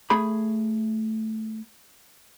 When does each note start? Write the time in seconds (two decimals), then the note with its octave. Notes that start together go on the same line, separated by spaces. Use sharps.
0.10 A3 G#4 B5